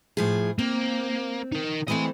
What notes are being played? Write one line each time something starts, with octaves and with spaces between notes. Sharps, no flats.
A2 F3 G#4
A#3 C4
D#4 A#4
E3 A3 C4 D#5 G#5